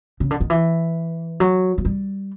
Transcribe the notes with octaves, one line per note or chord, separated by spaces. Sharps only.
C#3
D3
D#3
E3
F#3
F#3
G3